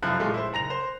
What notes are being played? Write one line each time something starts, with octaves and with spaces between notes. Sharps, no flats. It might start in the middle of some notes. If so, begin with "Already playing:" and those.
F1 F#2 F3 E4 F#6
A#2 F3 G#3 A3
E4 C5
F#1 A#5 A#6 F7
C5